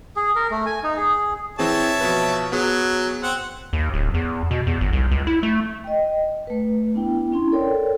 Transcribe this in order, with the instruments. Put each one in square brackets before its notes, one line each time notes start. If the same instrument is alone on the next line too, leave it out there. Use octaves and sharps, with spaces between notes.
[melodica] G#4
A#4
A3
G#5
D#4
G#4
[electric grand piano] E3 C4 G#4 [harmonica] C#5 E5 A5
[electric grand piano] B2 F3 B4
[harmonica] F#3 [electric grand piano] B3 G#4
[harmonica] C4 F#5
[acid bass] D#2
D1
E2
B2
E2
G1
C2
C#2
E4
A3
[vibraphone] D#5 G5
A3 B4
B3 D4 E4 G5
C#4 E4 C6
A4 A#4 C#5 D5 G5